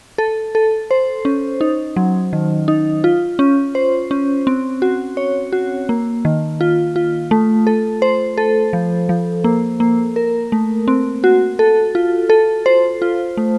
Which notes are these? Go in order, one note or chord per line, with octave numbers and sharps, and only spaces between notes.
A4
A4
C5
C#4
D#4
F#3
D#3
D#4
F4
C#4
C5
C#4
C4
F#4
C#5
F#4
A#3
D#3
F4
F4
A3
A4
C5
A4
F3
F3
A#3
A#3
A#4
A3
C4
F#4
A4
F4
A4
C5
F4
A3